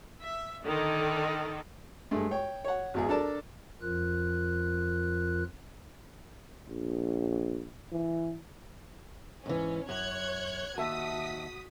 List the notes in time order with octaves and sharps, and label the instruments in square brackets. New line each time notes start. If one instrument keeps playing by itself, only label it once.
[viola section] E5
D3 D#3 A4
[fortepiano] G2 G#3 A3
C#5 G5
C#5 F#5
G#1 E2 G#4
D4 A4 A#4 D5 A5
[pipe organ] F2 F3 F4 A#4 F#6
[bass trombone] A#1
E3
[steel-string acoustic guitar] G#2 E3 [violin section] C#4
[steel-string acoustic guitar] F#2 [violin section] C#5 F#6 G#6
[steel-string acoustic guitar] D#2 E5 A5 [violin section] F#4 D#6 B6